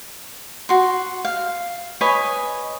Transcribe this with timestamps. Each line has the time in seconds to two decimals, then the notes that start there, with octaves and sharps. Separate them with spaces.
0.69 F#4 C6
1.25 F5
2.01 B4 C#5 D#5 G#5